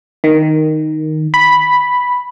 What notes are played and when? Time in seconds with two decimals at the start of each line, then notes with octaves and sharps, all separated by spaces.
0.24 D#3
1.34 B5